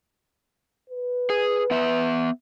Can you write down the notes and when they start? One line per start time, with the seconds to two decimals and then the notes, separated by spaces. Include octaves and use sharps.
0.90 B4
1.30 G#4
1.71 B3 E5